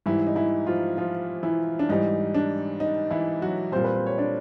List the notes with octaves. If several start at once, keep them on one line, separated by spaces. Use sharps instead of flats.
G#2 E3 G3 E4
D#4
E3 E4
F3 F4
F3 F4
E3 E4
D4
G#2 E3 G3 D#4
D4
D#4
E3 E4
F#3 F#4
A#2 G3 C4 C5
B4
C5
C#5
D4 D5